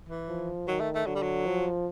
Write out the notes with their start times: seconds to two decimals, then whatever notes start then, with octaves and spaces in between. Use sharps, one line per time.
0.09 E3
0.29 F3
0.68 D#3 F#3
0.80 A3
0.95 A3
1.07 D3 F#3
1.15 G3
1.22 F#3
1.46 F3